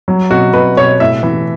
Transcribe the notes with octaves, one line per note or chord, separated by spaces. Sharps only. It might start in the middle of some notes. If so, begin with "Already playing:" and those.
F#3
B2 F#4
B2 B4
B2 C#5
A2 E5
E3